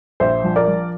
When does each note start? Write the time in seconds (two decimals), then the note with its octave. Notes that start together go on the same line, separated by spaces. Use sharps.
0.20 A#1 C5 E5
0.44 F3
0.56 A#4 D5
0.68 F3